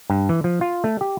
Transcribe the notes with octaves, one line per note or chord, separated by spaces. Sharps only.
G2
E3
F3
F4
A3
G4